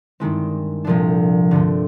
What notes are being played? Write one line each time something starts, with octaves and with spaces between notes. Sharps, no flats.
G2 D#3 G#3 C4 E4
C2 A#2 F3 A3 D4
G2 D3 F3 A3 C4